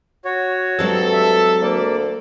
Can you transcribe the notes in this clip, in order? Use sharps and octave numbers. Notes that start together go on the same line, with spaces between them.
F#4 C#5
G2 F#3 G#3 C4 A4
E5
D2 A#3 D5